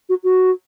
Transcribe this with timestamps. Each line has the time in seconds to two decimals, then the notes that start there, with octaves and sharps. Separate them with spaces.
0.09 F#4
0.24 F#4